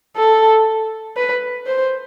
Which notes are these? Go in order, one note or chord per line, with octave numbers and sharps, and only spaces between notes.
A4
B4
C5